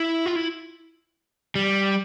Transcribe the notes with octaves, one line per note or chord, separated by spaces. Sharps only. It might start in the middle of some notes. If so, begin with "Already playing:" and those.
Already playing: E4
F4
E4
G3